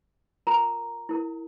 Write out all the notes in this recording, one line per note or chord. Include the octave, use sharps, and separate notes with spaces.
F4 A#4 A#5
E4 A#4